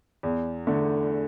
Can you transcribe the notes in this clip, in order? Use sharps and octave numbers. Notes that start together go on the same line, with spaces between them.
E2
D3 A3